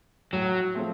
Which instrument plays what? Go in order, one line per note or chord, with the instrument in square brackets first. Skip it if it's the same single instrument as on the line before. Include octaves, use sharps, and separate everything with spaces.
[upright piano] A2 [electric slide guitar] F#3
[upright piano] F3 A3 C4